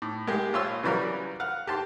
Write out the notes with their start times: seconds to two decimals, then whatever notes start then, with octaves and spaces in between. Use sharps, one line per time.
0.02 A2
0.27 G#3 A#3 G4
0.53 A#1 F4 C#5 C6 E6
0.83 C#3 E3 F#3 G3 F#4 A#4
1.40 F5 F#5
1.67 G4 A5 C6